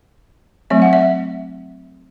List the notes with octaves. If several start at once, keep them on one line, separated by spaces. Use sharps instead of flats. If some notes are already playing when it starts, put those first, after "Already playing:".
F#3 A3 C4 E5
F#5
E5